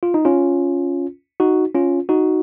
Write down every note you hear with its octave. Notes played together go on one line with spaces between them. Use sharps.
F4
D#4
C#4 F4
D#4 F#4
C#4 F4
D#4 F#4